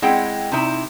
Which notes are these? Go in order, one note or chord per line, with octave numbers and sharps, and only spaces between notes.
G#3 C4 E4 F#5 G5
C3 D#4 E4